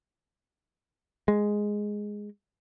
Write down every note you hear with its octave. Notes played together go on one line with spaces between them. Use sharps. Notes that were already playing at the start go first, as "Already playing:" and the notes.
G#3